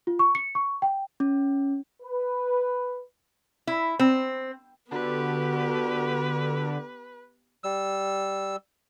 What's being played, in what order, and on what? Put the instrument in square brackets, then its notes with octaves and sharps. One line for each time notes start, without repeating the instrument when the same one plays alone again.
[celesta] F4
C#6
C#7
C#6
G5
[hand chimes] C#4
[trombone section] B4
[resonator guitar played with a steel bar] E4
C4
[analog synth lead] D3 [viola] B3 G4 [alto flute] F#4 [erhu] B4
[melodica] G3 E6